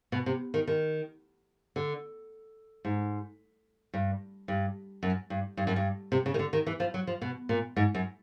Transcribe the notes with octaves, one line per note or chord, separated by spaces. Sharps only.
B2
C3
D#3
D#3
D3
G#2
G2
G2
F#2
G2
G2
F#2
G2
C3
C#3
D#3
D3
D#3
E3
F3
F#3
F3
B2
A#2
G#2
F#2